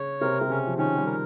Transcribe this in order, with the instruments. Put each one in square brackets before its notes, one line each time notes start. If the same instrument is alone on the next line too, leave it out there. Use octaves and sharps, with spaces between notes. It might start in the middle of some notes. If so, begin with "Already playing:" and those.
Already playing: [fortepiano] C#3 [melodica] C#5
[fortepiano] C3 [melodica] A#4
[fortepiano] C3
[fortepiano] C#3 [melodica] C#4
[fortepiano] F3
[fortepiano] D#3 [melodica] C#4
[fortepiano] G3
[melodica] A#4